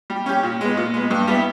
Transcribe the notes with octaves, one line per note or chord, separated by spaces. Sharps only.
G3
C#4 G4
A#2
G#3 B3
A#2
G#3 B3
G2
G3 B3 E4